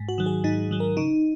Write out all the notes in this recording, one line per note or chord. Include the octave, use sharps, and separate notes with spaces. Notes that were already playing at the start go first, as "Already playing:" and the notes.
Already playing: G#2
F#4
D#3 F#3
G#4
G#2 D#4
D#3 F#3
A#4
C#3 D#4